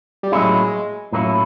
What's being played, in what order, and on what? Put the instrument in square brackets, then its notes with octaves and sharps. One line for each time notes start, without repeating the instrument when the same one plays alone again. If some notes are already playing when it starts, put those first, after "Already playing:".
[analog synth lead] G3
[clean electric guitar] A2 F#3 A#3 C#4 E4 [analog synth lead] G#3
[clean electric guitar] A2 F#3 A#3 C#4 E4